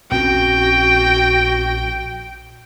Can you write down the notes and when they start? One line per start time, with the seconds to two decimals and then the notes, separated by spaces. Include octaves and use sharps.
0.11 A#1 C4 C#4 F#4 G5